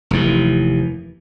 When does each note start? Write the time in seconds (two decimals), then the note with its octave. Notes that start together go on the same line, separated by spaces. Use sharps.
0.11 F1 D#2 E3